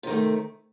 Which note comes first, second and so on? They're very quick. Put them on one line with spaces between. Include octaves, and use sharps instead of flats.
C3 D#3 A3